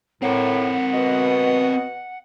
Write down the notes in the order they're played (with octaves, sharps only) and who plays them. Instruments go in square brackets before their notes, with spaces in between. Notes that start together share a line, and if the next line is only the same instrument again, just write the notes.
[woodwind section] A2 [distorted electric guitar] C4 A#4 [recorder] F#5
[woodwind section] B2 D#5